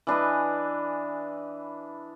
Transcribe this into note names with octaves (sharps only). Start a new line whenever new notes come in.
E3 D4 B4 D#5